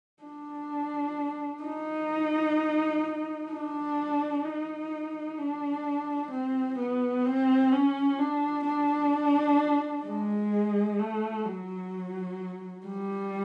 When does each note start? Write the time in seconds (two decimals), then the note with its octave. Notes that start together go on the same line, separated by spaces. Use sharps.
0.23 D4
1.64 D#4
3.50 D4
4.44 D#4
5.38 D4
6.31 C4
6.78 B3
7.25 C4
7.72 C#4
8.19 D4
8.66 D4
10.06 G#3
10.99 A3
11.46 F#3
12.87 G3